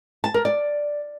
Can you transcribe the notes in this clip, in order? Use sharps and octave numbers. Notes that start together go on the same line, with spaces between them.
A5
A#4
D5